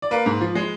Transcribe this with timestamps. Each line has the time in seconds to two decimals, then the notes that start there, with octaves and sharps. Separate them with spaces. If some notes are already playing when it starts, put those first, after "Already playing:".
0.02 D5
0.11 A#3 B4
0.26 G#2
0.41 F3
0.55 G#3